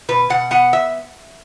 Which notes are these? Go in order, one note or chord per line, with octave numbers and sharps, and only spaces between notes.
B2 B4
B2 F#5
B3 F#5
E5